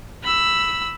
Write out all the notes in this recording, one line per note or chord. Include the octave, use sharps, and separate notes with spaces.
B5 E6